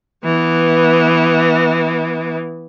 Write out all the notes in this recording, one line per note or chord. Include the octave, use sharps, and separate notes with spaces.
E3 B3